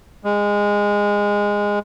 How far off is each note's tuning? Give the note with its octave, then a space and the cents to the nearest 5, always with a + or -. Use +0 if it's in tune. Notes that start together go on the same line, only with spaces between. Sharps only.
G#3 -20